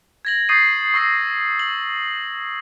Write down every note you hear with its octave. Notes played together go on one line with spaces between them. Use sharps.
G#6 A#6 F#7
C#6 D#6 G6 A6 C7 D#7
C#6 E6 A#6 C7
F#7